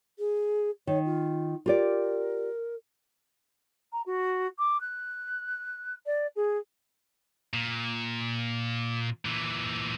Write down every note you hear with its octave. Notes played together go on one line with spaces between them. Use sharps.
G#4
D#3 C#5
F4
F4 G4 A#4 D5
A#5
F#4
D6
F#6
D5
G#4
A#2
A#2 E3